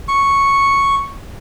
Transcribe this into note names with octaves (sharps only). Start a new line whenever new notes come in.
C#6